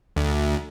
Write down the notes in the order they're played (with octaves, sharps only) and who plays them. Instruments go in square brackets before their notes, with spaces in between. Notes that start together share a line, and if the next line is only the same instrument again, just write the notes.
[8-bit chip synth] D2